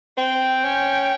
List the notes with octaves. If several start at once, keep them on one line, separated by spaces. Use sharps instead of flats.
C4 G5
C#4